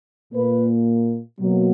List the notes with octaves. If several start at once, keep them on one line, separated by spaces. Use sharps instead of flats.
A#2 A#3 B4
B2 F#3 A#3